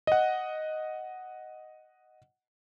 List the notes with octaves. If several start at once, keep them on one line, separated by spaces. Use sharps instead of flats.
D#5 F#5